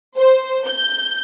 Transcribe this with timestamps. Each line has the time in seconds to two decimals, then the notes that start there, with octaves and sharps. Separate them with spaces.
0.17 C5
0.67 G6